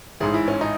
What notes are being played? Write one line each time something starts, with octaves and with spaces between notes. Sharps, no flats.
A1 G#2 E3 G#4
E4
C#4
D#4